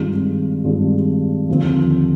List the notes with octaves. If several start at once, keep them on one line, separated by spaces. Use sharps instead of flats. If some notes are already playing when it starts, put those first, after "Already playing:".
Already playing: G2 D#3 G#3 C4 F4
G2 D#3 G#3 C4 F4
D#2 D3 F3 C4